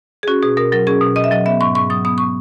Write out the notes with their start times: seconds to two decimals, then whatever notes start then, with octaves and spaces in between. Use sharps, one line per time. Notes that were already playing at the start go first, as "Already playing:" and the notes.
0.23 G#4
0.27 C#4 F#4
0.43 B2 G#4
0.57 B2 A#4
0.72 F#3 A#4
0.87 C#4 G#4
1.01 B2
1.16 B2 D#5
1.24 E5
1.31 F#3 D#5
1.46 B3 E5
1.61 G#2 C#6
1.75 G#2 C#6
1.90 F#3 D#6
2.05 B3 D#6
2.18 C#6